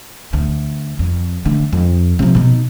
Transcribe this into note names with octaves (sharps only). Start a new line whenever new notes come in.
D2
F2
D3 A3
F2
C3 F3
B2 D#4